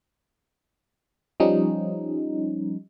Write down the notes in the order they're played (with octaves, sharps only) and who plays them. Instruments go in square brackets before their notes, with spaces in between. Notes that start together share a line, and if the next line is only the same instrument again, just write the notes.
[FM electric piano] F3 G3 C#4 D#4